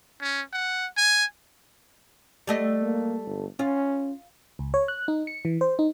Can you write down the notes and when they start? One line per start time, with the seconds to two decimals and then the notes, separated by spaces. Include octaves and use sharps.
0.21 C#4
0.53 F#5
0.97 G#5
2.47 G3 A3 D#5
2.82 A#3
3.26 G1
3.59 C#4 F4
4.59 C#2
4.74 C#5
4.88 F#6
5.08 D#4
5.27 C#7
5.45 E3
5.61 C5
5.79 D#4